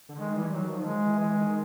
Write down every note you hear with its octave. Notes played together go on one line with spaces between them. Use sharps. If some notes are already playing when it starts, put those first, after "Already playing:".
D3
D#3 G#3
E3 G3
D#3 F#3
D#3 F3
G#3
E3
E3 G#3
D#3